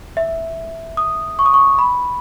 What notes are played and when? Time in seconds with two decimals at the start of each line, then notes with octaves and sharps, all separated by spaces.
0.17 E5
0.97 D#6
1.39 C#6
1.46 D#6
1.54 C#6
1.79 B5